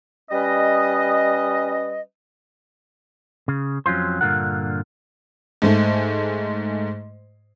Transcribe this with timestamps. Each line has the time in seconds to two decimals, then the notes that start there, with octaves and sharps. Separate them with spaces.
0.31 G3 C#4 B4 D#5
3.48 C#3
3.86 F2 F#3 C#4 F4 C5
4.21 G2 A#2 D3 F4 A#4 F#5
5.62 G#2 G#3 A3